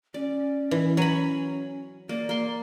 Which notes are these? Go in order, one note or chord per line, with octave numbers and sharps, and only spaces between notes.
C#4 D5
E3
F#3 C#5 G#5 A#5 B5
A#3 D5
A#3 C6